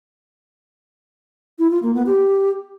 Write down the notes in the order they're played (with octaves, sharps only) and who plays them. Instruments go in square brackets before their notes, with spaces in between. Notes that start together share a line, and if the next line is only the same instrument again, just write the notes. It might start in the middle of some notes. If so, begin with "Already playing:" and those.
[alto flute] E4
F4
A#3
B3
G4